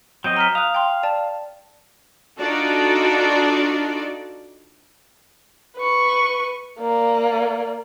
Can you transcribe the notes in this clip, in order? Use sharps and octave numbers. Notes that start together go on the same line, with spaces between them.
F#3 C4 D#5 G6
A#5 F6 B6
F5 D#6 F#6
G5 C6
D5 A5
D4 D#4 F4 F#4 A4 D5
B4 C#6
A#3 D5